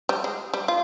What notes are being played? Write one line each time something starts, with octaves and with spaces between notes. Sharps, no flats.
G3
G#3
G3
F4